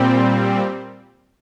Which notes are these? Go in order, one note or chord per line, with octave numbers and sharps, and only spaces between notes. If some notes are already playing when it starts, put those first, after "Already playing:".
Already playing: A#2 G3 C4